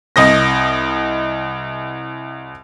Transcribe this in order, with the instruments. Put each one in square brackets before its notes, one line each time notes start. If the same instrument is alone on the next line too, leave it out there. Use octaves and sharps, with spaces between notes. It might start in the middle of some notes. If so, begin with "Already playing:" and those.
[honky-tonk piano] C2 D#5 A#6